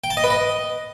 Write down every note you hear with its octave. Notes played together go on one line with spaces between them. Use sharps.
G5
A5
D#5
B4
D#5